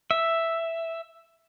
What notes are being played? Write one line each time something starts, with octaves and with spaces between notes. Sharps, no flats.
E5